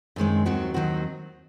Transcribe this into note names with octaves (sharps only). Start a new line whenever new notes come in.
F#2 D#3 G#3 C4
D#2 D#3 F#3 C4 F#4
D#2 D#3 F#3 C4 F#4